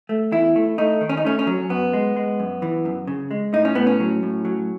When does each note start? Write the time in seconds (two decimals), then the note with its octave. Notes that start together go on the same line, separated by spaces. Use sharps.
0.09 A3
0.32 E2 E4
0.56 A3
0.78 A3 D#4
1.01 D#3
1.09 C#4
1.17 D#4
1.25 A3 C#4
1.39 C#4
1.47 F#3
1.69 F#2 B3
1.93 G#3
2.16 G#3
2.39 F#2
2.62 E3
2.85 F#2
3.07 C#3
3.31 G#3
3.53 A2 D#4
3.65 C#4
3.75 A2 B3
3.87 C#4
4.00 F#3
4.23 A2
4.45 F#3